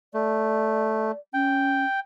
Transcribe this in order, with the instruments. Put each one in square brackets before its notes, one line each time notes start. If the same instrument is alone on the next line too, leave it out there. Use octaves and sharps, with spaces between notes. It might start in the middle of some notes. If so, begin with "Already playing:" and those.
[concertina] A3 [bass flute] D5
[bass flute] C#4 [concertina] G5